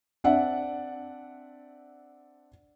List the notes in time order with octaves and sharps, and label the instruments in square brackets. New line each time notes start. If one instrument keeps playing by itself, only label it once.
[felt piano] C4 D4 D5 E5 F#5